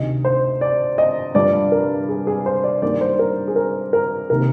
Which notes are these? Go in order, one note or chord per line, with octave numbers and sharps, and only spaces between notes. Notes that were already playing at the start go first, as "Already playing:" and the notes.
Already playing: D2 C3 D#3 D#5
C5
D5
D#5
G2 D3 F3 D5
A#4
G#4
G#4
C5
D5
G2 D#3 G3 A#3 D5
C5
A#4
G#4
A#4
A#4
C3 D#3 A#3 A#4